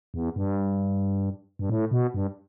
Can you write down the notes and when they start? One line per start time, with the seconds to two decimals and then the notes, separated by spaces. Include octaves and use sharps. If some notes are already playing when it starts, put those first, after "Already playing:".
0.14 E2
0.36 G2
1.59 G2
1.69 A2
1.91 B2
2.14 G2